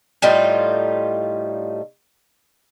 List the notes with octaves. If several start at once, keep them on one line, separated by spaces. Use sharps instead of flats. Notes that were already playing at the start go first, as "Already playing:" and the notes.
A2 G3 D#4 F4